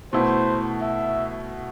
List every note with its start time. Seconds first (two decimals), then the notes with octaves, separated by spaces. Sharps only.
0.13 B2 A3 E4 C5
0.81 E5